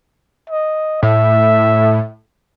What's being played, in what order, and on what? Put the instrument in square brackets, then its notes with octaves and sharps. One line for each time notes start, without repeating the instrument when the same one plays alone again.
[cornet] D#5
[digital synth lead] A2 [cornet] E5